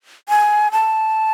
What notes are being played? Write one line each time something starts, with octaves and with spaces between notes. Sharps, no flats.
G#5
A5